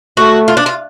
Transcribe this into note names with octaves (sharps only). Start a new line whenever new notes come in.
A3 F#4
F4
D4
F4